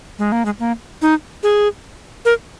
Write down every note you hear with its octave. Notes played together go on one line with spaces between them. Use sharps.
G#3
A#3
G#3
A#3
D#4
G#4
A#4